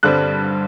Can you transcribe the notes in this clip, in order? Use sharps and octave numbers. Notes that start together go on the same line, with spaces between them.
G2 D3 G3 C4 F#6